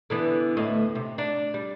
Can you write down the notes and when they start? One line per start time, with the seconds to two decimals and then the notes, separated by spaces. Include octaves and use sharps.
0.10 D3 E3 B3
0.57 D2 A2 D#5
0.95 C3
1.18 D4
1.54 G3